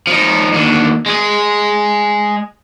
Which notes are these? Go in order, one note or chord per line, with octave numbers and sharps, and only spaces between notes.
F3 D#4
D#2 D3
G#3 G#4